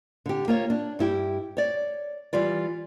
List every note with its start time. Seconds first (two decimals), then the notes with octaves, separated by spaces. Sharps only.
0.26 D3 G4
0.48 A#3 F4 C#5
0.70 D4
0.99 G2 E4 G4
1.57 C#5 D5
2.33 E3 G3 F4 D5